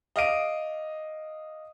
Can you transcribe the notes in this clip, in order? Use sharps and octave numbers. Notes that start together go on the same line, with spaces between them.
D#5 F5 D6 D7 D#7